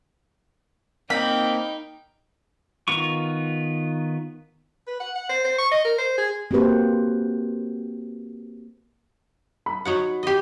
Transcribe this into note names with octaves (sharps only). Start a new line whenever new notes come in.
A#3 C4 D#4 G5 B5
D#3 B3 F4 C#6
B4
F#5
F#5
C5
C5
C#6
D#5
A#4
C5
G#4
A#3 C4 F#4 G4 B4 C5
B5
F#3 D#4 F#5
G4 D#5